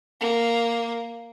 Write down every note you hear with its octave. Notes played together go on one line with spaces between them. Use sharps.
A#3